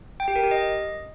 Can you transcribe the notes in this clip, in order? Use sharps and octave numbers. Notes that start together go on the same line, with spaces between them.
G5
G4
A#4
G4
D#5